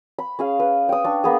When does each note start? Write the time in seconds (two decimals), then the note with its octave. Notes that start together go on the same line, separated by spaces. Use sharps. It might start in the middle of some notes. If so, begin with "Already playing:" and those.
0.18 B5
0.39 C#4 G#4 F5
0.60 B4
0.89 G5 D#6
1.04 D4 C#6
1.24 A#3 B3 G#4